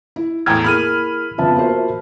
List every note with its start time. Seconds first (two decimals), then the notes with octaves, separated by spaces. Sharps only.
0.16 E4
0.46 E2 A2 G5 A#5 E6 G#6
0.64 A#3 E4 G#4 B5 F6 D#7
1.38 F2 C#3 B3 F4 E5 A5
1.56 A#3 F#4 C5